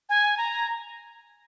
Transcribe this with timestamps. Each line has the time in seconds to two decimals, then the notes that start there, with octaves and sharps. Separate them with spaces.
0.09 G#5
0.38 A#5